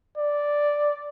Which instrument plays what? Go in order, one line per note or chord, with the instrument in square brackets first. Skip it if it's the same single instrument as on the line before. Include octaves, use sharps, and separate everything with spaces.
[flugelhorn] D5